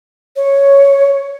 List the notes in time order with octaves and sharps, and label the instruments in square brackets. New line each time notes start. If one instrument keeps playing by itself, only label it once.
[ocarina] C#5